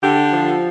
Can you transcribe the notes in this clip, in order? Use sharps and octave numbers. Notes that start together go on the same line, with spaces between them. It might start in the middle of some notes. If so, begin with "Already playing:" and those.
D3 G4
F3